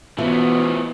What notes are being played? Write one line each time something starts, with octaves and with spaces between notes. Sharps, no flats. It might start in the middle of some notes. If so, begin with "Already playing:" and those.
B2 E3 F3 B3